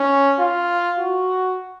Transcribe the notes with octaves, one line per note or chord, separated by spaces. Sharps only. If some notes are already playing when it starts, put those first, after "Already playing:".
Already playing: C#4
F4
F#4